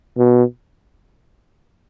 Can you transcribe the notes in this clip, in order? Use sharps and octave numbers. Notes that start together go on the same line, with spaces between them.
B2